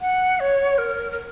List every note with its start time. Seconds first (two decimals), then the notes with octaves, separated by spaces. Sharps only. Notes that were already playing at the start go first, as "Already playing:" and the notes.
0.01 F#5
0.40 C#5
0.78 A#4
1.12 A#4